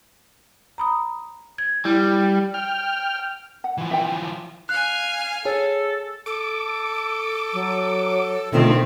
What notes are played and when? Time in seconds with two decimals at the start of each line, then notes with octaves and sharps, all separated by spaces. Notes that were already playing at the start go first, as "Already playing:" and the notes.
0.78 A#5 B5 D#6
1.58 G#6
1.85 G3 E4
2.54 G5 F6
3.64 F#5
3.78 E3 F3
3.91 E5 G5
4.69 F5 G#5 F#6
5.45 G#4 A4 C#5
6.26 A4 D6
7.53 F#3
8.53 B2 D3 D#3 A3 C4 F4 E5